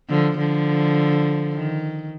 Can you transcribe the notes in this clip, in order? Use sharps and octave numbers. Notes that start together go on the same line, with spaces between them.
D3 F3
D3 F3
D#3